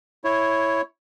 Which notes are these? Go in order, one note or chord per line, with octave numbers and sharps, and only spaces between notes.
E4 C#5